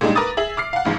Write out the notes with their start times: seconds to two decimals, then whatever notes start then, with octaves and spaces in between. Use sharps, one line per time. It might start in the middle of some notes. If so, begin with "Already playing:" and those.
0.01 A#2 G3 G#3 D4 D#4
0.15 A#4 B4 D6 D#6 A6
0.37 G#4 E5 F#7
0.57 D6 F6 C7
0.73 F5 F#5
0.85 A1 G#2 F3